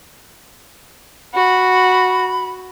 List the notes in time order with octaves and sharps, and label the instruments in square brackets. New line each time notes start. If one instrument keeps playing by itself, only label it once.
[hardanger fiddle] F#4 [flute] B5